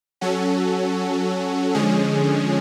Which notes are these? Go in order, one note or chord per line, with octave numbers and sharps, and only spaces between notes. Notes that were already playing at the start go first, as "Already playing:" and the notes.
F#3 C#4 F#4 A4
D3 F3 G#3 C#4 G#4